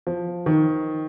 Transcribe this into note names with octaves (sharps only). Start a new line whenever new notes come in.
F3
D#3